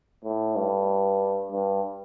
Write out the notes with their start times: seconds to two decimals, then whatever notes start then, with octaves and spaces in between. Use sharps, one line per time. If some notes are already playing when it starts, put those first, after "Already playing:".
0.24 A2
0.56 G2
1.52 G2